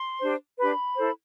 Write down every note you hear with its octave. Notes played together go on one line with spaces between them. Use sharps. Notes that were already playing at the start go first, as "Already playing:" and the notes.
Already playing: C6
D4 G4 C5
D4 G4 B4 B5
E4 A4 C5